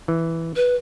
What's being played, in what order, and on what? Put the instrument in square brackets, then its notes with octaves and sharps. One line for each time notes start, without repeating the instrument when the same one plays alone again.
[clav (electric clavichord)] E3
[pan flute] B4